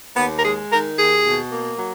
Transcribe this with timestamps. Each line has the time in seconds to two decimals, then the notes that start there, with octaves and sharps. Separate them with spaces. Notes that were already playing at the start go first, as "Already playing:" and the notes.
0.17 D#2 B3
0.38 A#4
0.43 G#3 G#4
0.71 D#3 A#4
0.97 D#2 G#4
1.25 B2
1.51 A#3
1.78 F#3